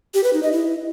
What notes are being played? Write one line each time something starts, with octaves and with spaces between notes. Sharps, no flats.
G4
B4
D#4
D#5
E4